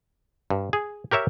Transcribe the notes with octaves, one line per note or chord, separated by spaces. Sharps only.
G2
G#4
G4 A#4 C#5 E5